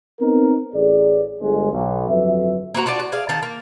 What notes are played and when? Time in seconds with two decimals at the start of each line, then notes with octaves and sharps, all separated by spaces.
0.21 B3 C4 D#4 A#4
0.74 A1 G#4 D5
1.40 G1 G#3
1.72 B1
2.09 G1 F2 F#3 B4 E5
2.74 A#3 C4 F#4 A#5
2.86 D4 F4 F#4 D5
3.00 F#4
3.12 G#4 D5 F5
3.29 D#3 F5 A5
3.43 A#3